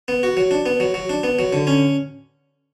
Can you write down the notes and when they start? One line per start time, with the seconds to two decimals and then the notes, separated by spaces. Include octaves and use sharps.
0.08 B3
0.23 F#4
0.37 F#3
0.51 D4
0.66 B3
0.80 F#3
0.94 F#3
1.10 D4
1.23 B3
1.39 F#3
1.53 D3
1.67 C#4